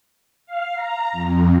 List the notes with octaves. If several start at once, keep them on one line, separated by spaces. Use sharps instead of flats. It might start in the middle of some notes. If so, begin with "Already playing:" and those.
F5
A#5
F2